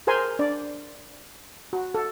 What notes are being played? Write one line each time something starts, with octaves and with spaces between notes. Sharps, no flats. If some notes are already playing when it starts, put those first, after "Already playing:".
G#4 A#4 C5 G#5 A#5 C6
D4 D5
F#4
A4